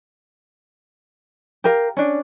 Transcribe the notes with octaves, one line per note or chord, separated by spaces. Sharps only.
G4 A#4 F5
C#4 D4